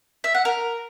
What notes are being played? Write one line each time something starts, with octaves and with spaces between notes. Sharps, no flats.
E5
F#5
A#4